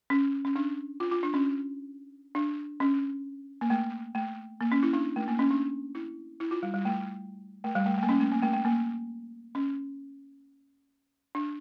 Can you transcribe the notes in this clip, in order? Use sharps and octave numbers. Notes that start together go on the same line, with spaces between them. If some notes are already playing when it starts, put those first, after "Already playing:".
C#4
C#4
D4
F4
F4
D4
C#4
D4
C#4
A#3
A3
A3
A#3
C#4
E4
D4
A3
A#3
C#4
D4
E4
E4
F4
G3
G3
A3
A3
G3
A3
A3
A#3
C#4
A3
A#3
A3
A3
A#3
C#4
D4